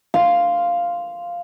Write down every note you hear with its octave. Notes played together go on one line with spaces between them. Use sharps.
F5 C6